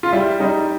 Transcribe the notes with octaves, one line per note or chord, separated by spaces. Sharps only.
F4
G3 E4
G3 D#4